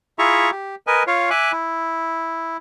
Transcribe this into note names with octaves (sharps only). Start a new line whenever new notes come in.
E4 F4 G#4 E5 A#5 C#6
G4
A#4 B4 D#5 G#5
F4 C#5 F5
E5 G#5 D6 F#6
E4